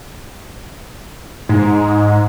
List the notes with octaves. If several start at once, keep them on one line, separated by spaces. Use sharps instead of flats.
G#2